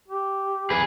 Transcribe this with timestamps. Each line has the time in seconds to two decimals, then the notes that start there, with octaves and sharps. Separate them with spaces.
0.08 G4
0.70 G#4 B4